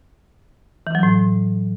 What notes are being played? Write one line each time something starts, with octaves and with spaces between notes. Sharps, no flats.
E3
F#3
A2